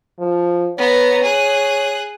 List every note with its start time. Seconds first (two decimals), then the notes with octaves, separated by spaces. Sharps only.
0.20 F3
0.78 B3 C#5 A#5
1.24 G#4 F#6